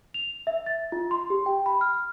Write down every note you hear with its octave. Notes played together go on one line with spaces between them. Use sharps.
F7
E5
A6
F4
C6
G4
G5
B5
F6